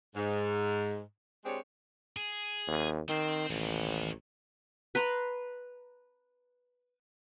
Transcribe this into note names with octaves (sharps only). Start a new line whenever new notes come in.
G#2
G#3 C4 D4 G4 G#4 C#5
G#4
D#2
D#3 C4 C5
A1 D#2
B4 A#5 C6